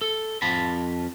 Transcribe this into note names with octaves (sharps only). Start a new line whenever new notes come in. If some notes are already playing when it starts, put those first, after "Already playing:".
A4
F2 F3 A5 B5